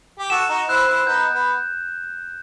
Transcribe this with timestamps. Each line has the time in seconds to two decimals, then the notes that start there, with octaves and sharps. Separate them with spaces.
0.19 G4
0.30 F#4 A4 E7
0.49 D#4 F#4
0.69 C4 E4 F#6
0.87 C4 E4
1.06 B3 D#4 G6
1.32 B3
1.44 G6